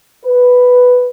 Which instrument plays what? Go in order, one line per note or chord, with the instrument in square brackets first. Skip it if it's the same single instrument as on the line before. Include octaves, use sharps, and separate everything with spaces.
[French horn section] B4